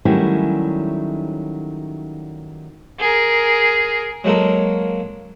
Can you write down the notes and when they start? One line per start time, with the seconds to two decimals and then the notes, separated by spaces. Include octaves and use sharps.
0.05 D#3 F#3 G3 A3 C#4 E4
2.99 G#4 A#4
4.24 F#3 G#3 A#3 A4 A#4